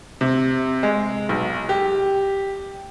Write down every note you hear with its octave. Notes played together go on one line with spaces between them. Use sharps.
C3
G#3
B1
G4